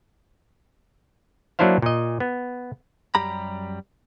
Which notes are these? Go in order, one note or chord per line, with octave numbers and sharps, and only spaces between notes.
F#3 A#3 D4 E4 C5 F5
A#2 D#5
B3
F#2 G3 G4 A#5 B5